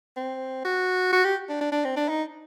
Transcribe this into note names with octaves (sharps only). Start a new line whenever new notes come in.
C4
F#4
F#4
G4
D4
D4
D4
C4
D4
D#4